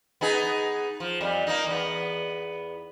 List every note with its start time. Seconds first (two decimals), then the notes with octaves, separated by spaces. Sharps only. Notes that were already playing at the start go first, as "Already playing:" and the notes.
0.21 B3 D#4 G#4
1.00 F3
1.21 F2 G3
1.47 A#3 D#4
1.67 E2 B3